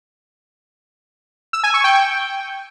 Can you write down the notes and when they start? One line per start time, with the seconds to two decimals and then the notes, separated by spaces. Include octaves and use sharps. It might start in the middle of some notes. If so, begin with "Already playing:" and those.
1.53 E6
1.64 G#5
1.74 C#6
1.84 G5
1.94 G5